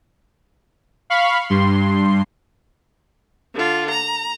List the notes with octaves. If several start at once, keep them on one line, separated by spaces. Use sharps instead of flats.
F5 B5 C#6 F6
G2 C6
D3 F4
A#5